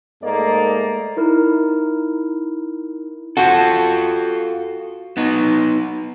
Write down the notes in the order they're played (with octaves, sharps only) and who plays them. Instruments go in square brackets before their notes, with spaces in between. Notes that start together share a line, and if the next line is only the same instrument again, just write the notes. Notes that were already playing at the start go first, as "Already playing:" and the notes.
[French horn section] G#2 A3 A#3 D5 D#5
[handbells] D#4 E4 A#4
[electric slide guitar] F4 A4 [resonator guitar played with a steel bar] F#4
[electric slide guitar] B3 D#4